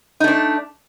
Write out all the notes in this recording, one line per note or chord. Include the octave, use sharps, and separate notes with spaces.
A3 D4 D#4